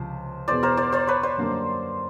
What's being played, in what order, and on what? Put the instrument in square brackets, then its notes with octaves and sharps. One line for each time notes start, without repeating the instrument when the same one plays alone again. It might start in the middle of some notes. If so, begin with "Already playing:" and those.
Already playing: [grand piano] C#2 C3 F3 [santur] C5
[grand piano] E2 B2 G#3 B3 [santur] C5 D5
[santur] A#4 C5
C5 D5
C5 D5
B4 C#5
C5 D5
[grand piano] F#2 D3 G3 A#3